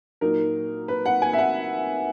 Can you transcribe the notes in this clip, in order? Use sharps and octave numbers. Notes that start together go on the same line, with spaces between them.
A#2 F#3 A#3 D#4 A#4
B4
F#5
G#5
E5
F#5